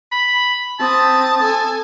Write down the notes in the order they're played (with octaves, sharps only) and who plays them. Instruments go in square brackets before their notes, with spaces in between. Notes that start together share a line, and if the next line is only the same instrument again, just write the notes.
[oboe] B5
[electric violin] C4 D#6 [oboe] A5
[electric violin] A4 G#5